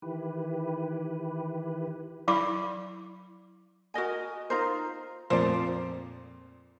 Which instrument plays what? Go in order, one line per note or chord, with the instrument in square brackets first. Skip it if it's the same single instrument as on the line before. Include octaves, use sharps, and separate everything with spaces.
[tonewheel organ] D#3 E3 E4 G4 B4
[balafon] F#3 E4 B5 D6
[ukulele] F#4 A#4 D#5 G#5
D#4 F4 A#4 C5
[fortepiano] F2 A#2 F3 [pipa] C5 D5